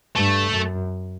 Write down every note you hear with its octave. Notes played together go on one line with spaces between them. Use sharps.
G2 A3
F#2